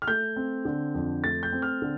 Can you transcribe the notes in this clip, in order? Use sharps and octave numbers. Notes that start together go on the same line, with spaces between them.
F6
A3 G6
C4
D3
F2
A3 A6
G6
C4
F6
D3